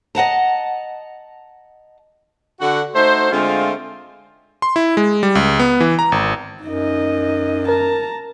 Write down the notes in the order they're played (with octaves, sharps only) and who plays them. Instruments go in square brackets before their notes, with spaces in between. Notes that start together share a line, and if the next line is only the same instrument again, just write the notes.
[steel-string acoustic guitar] D#5 F#5 A5 A#5
[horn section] D3 F#4 F#5
A3 D#4 F#4 C5
D3 G#3 A3 C4 F4
[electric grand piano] C6
E4
G#3
G3
C#2
B3
E3
A#5
G#1
[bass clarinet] F#2 [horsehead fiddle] D#4 D#5
[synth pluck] A#4 [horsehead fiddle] A5 A#5